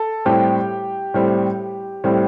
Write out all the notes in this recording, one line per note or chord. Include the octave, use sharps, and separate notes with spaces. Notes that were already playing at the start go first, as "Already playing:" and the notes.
Already playing: A4
A2 G3 C4 G4
A2 G3 C4
A2 G3 C4